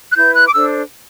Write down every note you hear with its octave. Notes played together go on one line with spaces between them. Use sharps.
F#6
E4 B4 G6
F#6
D6
D4 A4 C5 E6